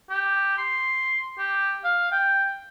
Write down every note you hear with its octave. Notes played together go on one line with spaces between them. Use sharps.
G4
C6
G4
F5
G5